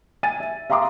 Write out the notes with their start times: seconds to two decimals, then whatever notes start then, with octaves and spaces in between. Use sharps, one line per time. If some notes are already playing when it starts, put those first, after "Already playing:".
0.23 G#5 A6 D#7
0.40 E5
0.70 E5 F5 A#5 C6 D6 D#6